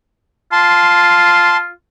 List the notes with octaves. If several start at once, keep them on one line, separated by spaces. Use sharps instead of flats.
F4 A5 C6